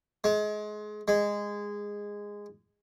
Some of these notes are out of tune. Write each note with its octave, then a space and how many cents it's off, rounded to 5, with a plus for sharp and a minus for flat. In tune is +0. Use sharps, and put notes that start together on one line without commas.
G#3 +25
G#3 -15